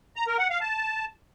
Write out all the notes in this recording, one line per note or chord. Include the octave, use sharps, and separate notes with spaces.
A#5
A#4
F#5
F5
A5